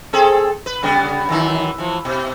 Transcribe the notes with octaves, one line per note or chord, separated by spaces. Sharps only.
C4 G#4 A4
B4
C#3 G3 B3
F#2 D#3 E3
E3 F3
B2